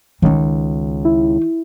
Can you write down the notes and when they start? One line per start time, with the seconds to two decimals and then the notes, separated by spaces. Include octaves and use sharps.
0.22 C#2 D#3 D#4
1.05 E4